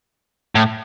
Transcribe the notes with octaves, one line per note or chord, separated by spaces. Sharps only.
A2